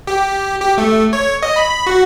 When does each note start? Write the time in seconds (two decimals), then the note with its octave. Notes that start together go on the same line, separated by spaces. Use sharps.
0.07 G4
0.60 G4
0.78 A3
1.13 C#5
1.43 D#5
1.56 B5
1.87 F#4